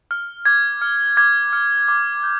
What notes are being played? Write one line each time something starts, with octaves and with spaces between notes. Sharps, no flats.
F6
D6 G#6
F6
D6 G#6
F6
D6
G6